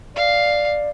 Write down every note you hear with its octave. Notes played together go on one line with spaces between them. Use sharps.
D5 F5